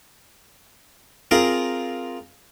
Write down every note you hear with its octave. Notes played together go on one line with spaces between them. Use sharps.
C4 F4 G#4 A#4